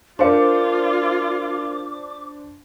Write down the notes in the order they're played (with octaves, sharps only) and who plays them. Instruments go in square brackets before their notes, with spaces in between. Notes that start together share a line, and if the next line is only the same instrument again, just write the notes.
[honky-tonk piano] D4 C5 C#7 [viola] F4 [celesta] A#4 F5 C6 [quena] D6